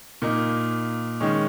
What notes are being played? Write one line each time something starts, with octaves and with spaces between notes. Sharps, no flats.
A#2 A#3 D#4
D#3 G#3 C#4